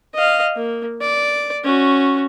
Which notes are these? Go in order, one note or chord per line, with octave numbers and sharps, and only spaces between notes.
D#5 F5
A#3
D5
C#4 F#4